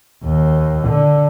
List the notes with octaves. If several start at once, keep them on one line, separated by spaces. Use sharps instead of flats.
D#2
D3